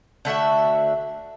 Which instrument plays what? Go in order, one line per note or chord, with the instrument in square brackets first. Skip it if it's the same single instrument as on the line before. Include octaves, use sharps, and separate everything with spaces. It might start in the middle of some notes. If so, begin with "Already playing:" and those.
[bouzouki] D3 A3 F#4 E5